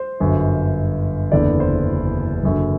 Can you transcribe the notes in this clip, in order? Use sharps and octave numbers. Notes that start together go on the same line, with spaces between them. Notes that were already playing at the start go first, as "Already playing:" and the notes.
Already playing: C5
G1 F#2 D3
F#1 E2 D3 D5
C5
F#1 F#2 D3